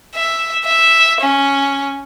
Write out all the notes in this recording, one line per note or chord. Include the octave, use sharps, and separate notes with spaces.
E5
E5
C#4